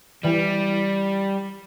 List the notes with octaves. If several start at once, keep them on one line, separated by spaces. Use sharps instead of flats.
E3 G3